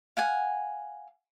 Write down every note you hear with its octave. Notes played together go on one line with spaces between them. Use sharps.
F5 F#5 G#5